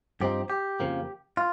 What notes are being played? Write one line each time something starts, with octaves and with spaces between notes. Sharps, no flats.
G2 F3 C4 D#4 G4
G4
F2 C#3 F3 A#3
F4